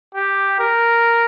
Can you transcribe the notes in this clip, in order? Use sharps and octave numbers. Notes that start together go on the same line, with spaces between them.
G4
A#4